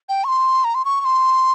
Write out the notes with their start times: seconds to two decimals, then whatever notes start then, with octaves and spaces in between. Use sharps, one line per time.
0.09 G5
0.24 C#6
0.28 C6
0.64 A#5
0.74 C6
0.85 C#6
1.01 C#6
1.05 C6